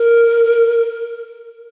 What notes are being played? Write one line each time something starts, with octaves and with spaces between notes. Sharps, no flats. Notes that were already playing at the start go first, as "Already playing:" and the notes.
Already playing: A#4